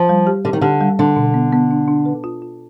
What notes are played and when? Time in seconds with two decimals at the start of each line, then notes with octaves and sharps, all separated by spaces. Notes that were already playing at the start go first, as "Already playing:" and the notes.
Already playing: F3
0.09 G3
0.27 G4
0.45 D3 G4
0.53 D#3
0.61 D3 G4
0.81 G3
0.99 D3 D4
1.16 B2
1.34 B3
1.53 B3
1.71 D4
1.88 D4
2.05 B4
2.24 F4
2.42 F4